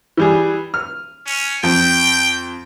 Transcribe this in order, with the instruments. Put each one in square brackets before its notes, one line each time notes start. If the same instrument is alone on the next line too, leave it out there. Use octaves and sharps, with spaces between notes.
[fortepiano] E3 G3 G#4
F6
[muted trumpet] C#4
[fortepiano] F2 [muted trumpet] G5